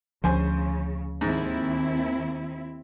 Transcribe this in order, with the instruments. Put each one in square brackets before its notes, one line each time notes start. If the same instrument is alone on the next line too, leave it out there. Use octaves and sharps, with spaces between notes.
[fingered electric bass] D2 F3 [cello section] C#3 [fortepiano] C5 G#5
[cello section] D#2 C4 E4 [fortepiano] G#2